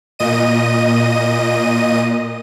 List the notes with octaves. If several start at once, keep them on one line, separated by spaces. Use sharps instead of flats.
A#2 D#5 D#7